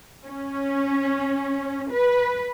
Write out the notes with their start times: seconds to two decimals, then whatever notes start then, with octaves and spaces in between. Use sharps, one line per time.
0.25 C#4
1.92 B4